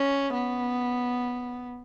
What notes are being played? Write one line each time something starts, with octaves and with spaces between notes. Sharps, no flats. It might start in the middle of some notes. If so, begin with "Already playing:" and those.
Already playing: C#4
B3